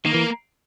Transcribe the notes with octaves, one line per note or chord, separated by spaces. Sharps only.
D#3 A#3
E3